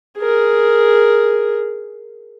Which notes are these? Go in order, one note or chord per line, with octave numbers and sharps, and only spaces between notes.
G#4 A#4